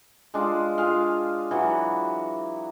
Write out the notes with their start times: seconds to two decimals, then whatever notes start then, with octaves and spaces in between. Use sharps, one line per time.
0.34 G#3 D4 F4 G#4
0.78 F4 G#4 F5
1.51 E3 F#3 F#4 B4